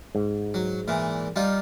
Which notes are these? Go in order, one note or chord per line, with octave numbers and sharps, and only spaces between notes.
G#2
F#3
A#2 E3
G3 D#4 F4